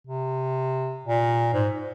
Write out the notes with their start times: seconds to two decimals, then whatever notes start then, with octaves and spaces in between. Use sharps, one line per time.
0.07 C3
1.05 A#2
1.54 G#2